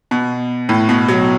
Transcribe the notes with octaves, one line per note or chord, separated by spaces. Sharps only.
B2
A2
B2
F#3